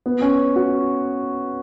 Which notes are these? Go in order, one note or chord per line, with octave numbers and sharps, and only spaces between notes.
B3
C#4
F#4